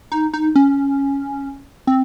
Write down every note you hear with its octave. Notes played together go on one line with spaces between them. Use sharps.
D#4
D#4
C#4
C4